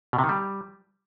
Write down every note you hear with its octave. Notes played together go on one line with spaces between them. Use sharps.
B2
C3
D#3
G3